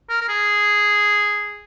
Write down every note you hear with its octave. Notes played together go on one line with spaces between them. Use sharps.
A#4
A#4
G#4